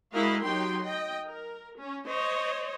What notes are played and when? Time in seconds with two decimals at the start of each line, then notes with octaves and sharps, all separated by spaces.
0.12 G#3 E4 F#4 A#4 D#5 F5
0.42 F#3 D#4 G4 G5 C6
0.83 D#5 G5
1.27 A#4
1.77 C#4
2.07 C5 C#5 D#5